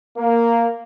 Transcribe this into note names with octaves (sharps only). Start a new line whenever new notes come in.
A#3